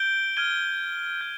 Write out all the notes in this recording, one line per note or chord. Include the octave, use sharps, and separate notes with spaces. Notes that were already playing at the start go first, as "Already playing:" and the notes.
Already playing: G6 D7 G7
F6 G#6 D#7 G7
G6